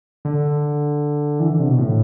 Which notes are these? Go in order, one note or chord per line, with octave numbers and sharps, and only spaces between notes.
D3
E3
D3
C3
B2
A2